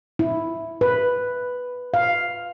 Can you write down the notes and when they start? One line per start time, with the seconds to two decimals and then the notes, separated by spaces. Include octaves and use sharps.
0.19 E4
0.81 B4
1.94 F5